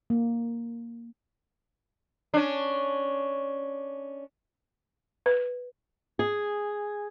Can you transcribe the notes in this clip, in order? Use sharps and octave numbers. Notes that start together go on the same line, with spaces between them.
A#3
C#4 D4
B4
G#4